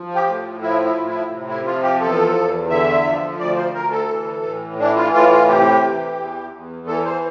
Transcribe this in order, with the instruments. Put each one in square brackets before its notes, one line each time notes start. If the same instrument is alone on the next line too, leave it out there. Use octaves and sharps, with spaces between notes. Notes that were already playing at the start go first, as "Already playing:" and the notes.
Already playing: [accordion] F3
G4
A2
F3 E4
E4
A2
E4
C3
E4
F3 F4
G4
E2 A4
E2
D3 E5
F3
D2 D5
C5
D2 A#4
A4
E3
A2
E3 D4
F4
A2 F4
F4
C3 G4
E3
E2
E2
E3 A4
C5